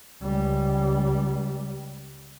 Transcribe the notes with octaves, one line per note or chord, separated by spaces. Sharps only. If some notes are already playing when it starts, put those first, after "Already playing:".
C#2 G3